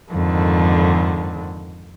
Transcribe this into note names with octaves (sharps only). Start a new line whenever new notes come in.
F2 G#2 D3 D#3